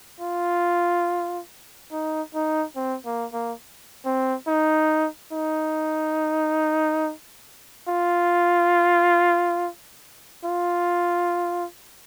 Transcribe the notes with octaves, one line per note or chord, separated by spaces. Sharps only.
F4
D#4
D#4
C4
A#3
A#3
C4
D#4
D#4
F4
F4